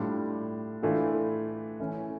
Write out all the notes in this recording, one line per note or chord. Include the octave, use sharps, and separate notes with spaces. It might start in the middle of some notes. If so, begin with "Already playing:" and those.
Already playing: A2 G3 D4 F4
A2 E3 A3 D4 F4
E3 A3 C#4